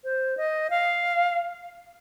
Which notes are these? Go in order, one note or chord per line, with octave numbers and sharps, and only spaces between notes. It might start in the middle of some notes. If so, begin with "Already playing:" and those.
C5
D#5
F5